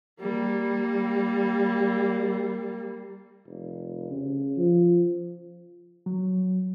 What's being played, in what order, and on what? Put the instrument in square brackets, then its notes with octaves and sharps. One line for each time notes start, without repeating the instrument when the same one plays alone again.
[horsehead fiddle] G3 A#3
[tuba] F1
C#3
F3
[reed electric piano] F#3